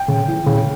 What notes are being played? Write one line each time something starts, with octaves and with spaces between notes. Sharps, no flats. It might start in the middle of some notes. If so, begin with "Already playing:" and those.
Already playing: G5
C#3
E3
C#3